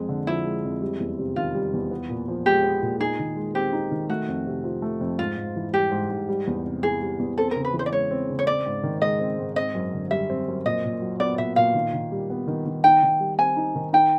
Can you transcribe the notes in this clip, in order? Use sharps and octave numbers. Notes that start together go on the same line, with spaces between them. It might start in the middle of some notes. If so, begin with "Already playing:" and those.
Already playing: F2 G#3
D3
F3 E4
G#3
F2
G3
E2
C3
D#3 F4
G3
E2
B3
A#2
F3
G#3 G4
B3
A#2
D#4 G#4
D#3
G#3
C4 G4
D#4
D#3
A3 F#4
F2
C3
F3
A3
F2
G#2 F4
G#2
E3
G3 G4
G#2
G#2
G3
E2
C3
E3 G#4
G3
E2
C4 A4
C#3 A#4
B4
E3
C5
D5
G#3 C#5
C4
C#3
C#5
C4 D5
G#2
D#3
G#3 D#5
C4
G#2
C4 D#5
F#2
D3
G3 E5
C4
F#2
A#2 D#5
A#2
F#3
B3 D5
A#2 E5
A#2 F5
D#3
D#3
G3
B3
D#3
D#3
D#4 G5
D#3
G3
C4 G#5
D#4
D#3
D#4 G5